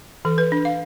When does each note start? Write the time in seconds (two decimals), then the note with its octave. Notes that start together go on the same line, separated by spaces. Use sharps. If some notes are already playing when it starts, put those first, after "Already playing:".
0.25 E3 A4
0.38 B4
0.52 D4
0.65 F5